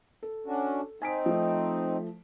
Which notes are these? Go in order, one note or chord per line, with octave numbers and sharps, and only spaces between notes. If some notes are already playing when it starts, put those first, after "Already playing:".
A4
C#4 D4 F#4
C4 D#4 G#5 B6 D7
F3 A3